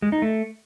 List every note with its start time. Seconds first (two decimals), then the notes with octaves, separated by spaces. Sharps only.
0.02 G#3
0.12 D#4
0.22 A3